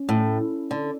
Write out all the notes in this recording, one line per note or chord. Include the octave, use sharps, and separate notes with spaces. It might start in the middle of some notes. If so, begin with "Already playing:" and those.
Already playing: C#4
A2
D3